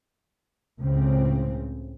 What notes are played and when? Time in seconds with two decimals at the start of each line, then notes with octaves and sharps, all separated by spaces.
0.79 C#2 A2 C#3 C4